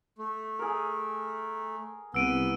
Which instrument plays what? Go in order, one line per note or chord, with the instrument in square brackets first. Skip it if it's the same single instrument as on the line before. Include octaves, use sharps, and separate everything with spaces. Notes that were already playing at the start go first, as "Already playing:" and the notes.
[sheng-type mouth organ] A3
[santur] G#4 A#4
[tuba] C2 [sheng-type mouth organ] B3 [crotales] E6 D7 D#7